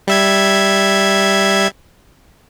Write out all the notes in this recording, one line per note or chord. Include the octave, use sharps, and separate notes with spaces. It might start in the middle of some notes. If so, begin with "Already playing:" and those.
G3 E5 G#6